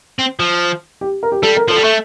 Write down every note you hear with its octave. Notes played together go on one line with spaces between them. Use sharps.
C4
F3
G4
A#4
G4
G3 A4
A#4
F3 A4
G3
A3